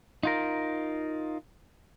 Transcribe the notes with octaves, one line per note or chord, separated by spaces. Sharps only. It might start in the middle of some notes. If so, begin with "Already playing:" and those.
D#4 F4 A#4